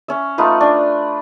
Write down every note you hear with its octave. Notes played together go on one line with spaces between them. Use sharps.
C#4 E5
A3 D#4 F4 B4
D4